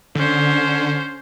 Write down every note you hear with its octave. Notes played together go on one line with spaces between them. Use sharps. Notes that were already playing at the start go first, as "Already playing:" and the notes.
D3 C#4 C5